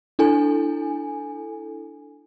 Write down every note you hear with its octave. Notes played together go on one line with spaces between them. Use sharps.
D4 E4 A4 G#5